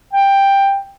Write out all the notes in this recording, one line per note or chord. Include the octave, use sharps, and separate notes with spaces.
G5